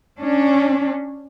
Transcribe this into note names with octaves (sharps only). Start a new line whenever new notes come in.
C#4 D4